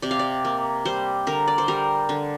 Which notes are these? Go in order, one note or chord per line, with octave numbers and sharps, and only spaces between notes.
C3 D5
F5
D5
A#3
G3 C5
D3 A#4
D5
C5
G3 A#4
D3